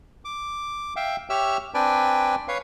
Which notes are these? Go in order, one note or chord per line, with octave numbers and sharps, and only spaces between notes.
D6
E5 F5 G5
G4 C#5 E5 E6 F6
C4 D4 B4 D5 G5 G#5
B4 C#5 F5